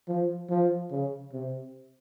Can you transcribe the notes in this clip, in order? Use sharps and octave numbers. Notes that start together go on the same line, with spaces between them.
F3
F3
C#3
C3